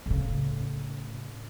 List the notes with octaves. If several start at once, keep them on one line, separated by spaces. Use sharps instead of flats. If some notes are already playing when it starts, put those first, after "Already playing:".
A2 C#3